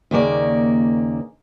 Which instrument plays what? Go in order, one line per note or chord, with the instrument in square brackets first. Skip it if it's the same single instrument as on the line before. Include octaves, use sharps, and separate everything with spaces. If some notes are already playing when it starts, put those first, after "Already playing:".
[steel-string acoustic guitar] D#2 C#3 A#3 D5